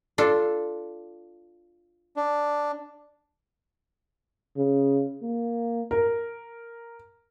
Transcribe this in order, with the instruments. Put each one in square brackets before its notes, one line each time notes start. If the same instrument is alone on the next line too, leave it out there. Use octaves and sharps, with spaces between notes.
[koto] D4 F4 A4
[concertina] D4
[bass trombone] C#3
A#3
[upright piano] A#4